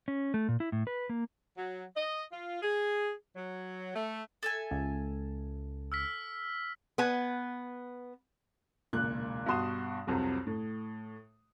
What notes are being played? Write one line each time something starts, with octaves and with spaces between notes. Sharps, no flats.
C#4
A3
A#2
E4
A2
B4
A#3
F#3
D#5
F4
G#4
F#3
A3
A4 E5 G#5
C#2
E6 F6 B6
B3 B4 G#5
E1 C#2 A#2 F#6
G2 B2 F#4 C6 D#6 E7
C2 F2 C3 F#3
A2